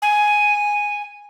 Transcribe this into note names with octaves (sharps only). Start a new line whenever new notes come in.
G#5